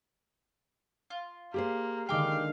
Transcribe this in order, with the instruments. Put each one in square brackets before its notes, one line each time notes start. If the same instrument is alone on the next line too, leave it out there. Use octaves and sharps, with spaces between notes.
[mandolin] F4
[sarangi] A#3 [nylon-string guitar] G4 G#4 C5
[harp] D3 D#3 G#3 [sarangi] F5 [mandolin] G5 D6